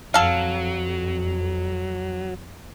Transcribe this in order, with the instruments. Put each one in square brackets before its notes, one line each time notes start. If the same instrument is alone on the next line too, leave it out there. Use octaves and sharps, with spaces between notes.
[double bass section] F2 [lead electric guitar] F#3 [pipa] A4 F5